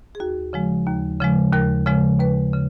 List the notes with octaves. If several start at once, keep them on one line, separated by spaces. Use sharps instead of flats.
G#4
D#2 F#4
C#3 F3 G#3
D#2
C#3 F3 G#3
D#2 A#4
C#3 F3 G#3
D#2 B4
C#3